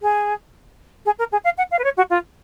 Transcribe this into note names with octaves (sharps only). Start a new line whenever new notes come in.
G#4
G#4
A#4
G#4
F5
F#5
F5
B4
C#5
F#4
F4